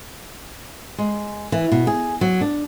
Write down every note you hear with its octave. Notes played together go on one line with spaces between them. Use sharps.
G#3
E3
B2
G#4
F#3
D4